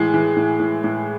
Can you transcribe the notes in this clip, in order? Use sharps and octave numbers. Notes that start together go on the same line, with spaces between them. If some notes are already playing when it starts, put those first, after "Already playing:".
Already playing: A2 E3 G#3
E3
A2
A2
A2